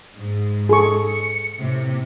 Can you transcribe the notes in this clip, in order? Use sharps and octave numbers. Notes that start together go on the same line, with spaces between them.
G#2
G#4 A4 C#6
C#7
A2 C3